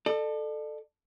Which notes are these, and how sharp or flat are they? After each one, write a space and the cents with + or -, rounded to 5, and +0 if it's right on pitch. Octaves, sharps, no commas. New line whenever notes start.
A4 +0 D5 +40